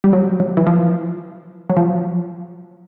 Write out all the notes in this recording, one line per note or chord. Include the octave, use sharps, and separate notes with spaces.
G3
F#3
F#3
E3
F3
F#3
F3